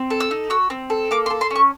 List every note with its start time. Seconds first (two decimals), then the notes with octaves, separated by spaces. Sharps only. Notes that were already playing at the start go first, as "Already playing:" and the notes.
Already playing: C4
0.10 A4
0.20 E6
0.31 D#4
0.50 F#4 E6
0.70 C4
0.90 A4
1.11 A#3 D6
1.26 C6
1.30 A4
1.41 C6
1.51 C#4
1.56 C#6